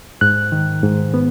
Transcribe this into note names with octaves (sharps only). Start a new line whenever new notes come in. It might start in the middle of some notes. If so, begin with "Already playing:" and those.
G#2 F#6
D#3
G#2
B3